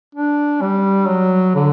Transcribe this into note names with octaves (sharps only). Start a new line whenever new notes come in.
D4
G3
F#3
D3